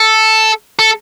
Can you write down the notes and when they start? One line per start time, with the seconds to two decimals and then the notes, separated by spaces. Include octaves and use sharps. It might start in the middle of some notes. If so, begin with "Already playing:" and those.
Already playing: A4
0.79 A4